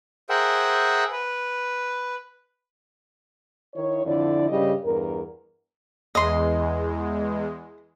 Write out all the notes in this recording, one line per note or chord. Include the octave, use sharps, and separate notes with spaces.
G#4 A#4 C5 E5 F#5 G5
B4
D#3 E4 C#5
F2 D3 E4 D5
G2 C#3 G3 G4 D#5
E2 G2 A#4
E2 G#3 D#5 C6